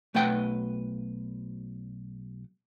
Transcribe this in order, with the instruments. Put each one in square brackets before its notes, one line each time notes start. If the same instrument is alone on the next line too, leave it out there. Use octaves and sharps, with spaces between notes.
[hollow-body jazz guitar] B1 A3 B4 F#5 G5